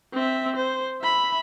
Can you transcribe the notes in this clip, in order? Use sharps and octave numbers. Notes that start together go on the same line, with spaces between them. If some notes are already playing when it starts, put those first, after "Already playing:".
C4 E5
C5
E5 B5